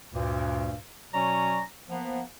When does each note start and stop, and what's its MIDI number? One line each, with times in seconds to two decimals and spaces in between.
0.13 0.73 38
0.13 0.73 43
0.13 0.73 46
1.12 1.59 47
1.12 1.59 54
1.12 1.59 61
1.12 1.59 73
1.12 1.59 74
1.12 1.59 82
1.90 2.20 53
1.90 2.20 58
1.90 2.20 59